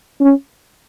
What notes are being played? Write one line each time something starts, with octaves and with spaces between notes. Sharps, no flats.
C#4